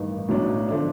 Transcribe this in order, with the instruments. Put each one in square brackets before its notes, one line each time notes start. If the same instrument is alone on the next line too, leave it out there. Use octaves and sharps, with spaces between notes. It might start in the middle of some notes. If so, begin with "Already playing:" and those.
Already playing: [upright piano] A1 G2 D#3
B1 A2 F#3 B3 D4
D3 F3 A3 D4